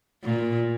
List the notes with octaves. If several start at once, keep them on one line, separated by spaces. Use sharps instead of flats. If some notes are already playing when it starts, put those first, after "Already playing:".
A#2